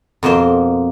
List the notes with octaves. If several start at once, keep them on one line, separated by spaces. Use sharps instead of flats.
F2 B2 A#3 C5